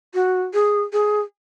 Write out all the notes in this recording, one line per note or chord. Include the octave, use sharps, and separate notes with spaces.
F#4
G#4
G#4